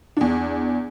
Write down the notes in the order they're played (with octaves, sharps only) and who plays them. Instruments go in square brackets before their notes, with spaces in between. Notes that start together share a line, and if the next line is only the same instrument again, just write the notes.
[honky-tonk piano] E2 D4